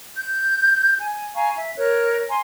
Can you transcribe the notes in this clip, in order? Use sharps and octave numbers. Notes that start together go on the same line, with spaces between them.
G6
G#5
F5 G#5 A#5 C#6
E5
A#4 C#5 F#6
G#5 A#5 C6